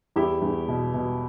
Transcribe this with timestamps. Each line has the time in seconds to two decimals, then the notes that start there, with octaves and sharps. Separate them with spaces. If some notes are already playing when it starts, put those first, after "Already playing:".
0.16 E2 E4 G4
0.42 E2
0.68 B2
0.94 B2